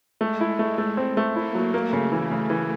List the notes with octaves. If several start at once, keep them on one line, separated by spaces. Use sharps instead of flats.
G#3 A3
E4
A3
A3
C4
A3
A#3 E4
F#3
A3 A#3
C#3
E3 A3
C#3
E3